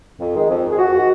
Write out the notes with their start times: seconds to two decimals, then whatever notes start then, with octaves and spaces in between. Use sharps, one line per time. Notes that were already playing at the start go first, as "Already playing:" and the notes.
0.20 F2
0.34 D#3 G#3
0.50 F2
0.63 D#3 G#3
0.73 G#4
0.79 F2 F#4
0.94 D#3 G#3 F#4